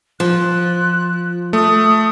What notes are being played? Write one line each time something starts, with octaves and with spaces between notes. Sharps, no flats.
F3 F#6
A3 D#6